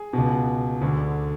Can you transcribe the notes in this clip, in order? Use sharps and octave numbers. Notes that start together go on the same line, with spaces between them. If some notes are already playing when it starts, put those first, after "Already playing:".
Already playing: G#4
C#2 B2
D2 D3